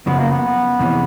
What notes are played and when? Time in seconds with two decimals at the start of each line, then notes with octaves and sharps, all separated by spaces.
0.06 F#2 C#3 F3 G#3 B3
0.19 A#3
0.31 B3
0.79 F2 C3 E3 G#3 C#4